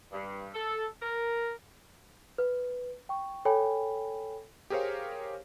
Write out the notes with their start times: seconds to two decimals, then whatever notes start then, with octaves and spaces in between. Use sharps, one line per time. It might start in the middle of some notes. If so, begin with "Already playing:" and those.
0.12 G2
0.54 A4
1.02 A#4
2.38 B4
3.09 G5 C#6
3.45 A4 C#5 G5 G#5 B5
4.70 G4 G#4 A#4 C5 C#5 F5